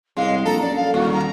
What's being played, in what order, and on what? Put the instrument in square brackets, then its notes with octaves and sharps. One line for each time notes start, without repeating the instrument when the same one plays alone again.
[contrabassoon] C2 [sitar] F#2 G#3 [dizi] F5
[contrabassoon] A#1 [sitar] A4 [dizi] A#5
[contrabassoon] F#2 [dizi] D5
[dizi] F5
[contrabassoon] D#1 [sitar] D#2 [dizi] F#4
[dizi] A#5